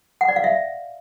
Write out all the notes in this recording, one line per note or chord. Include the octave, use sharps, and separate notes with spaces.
F#5
D5
F5
E5